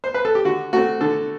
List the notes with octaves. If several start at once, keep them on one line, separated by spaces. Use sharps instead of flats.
C5
B4
A4
G4
D3 F#4
A3 C4 F#4
D3 A4